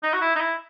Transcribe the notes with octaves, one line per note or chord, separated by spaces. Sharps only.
D#4
F#4
E4
D#4
E4